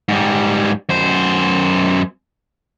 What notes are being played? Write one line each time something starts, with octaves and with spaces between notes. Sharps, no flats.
G#2 G3
F#2 C5